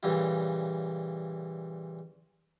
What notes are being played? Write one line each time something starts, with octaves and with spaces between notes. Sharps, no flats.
A#2 C#3 E3 G3 E4